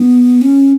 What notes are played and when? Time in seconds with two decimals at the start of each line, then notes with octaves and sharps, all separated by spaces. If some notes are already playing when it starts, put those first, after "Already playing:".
Already playing: B3
0.41 C#4